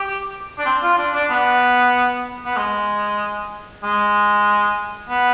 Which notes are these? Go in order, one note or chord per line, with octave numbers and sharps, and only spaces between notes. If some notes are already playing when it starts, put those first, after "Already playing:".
Already playing: G4
D4
C4
F4
D4
D4
B3
B3
G#3
G#3
B3